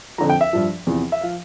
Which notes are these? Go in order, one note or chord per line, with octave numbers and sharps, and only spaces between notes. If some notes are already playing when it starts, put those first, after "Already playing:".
F2 D3 F3 A#5
G5
E5
G2 F3
E2 C3 F3
E5
F3 F5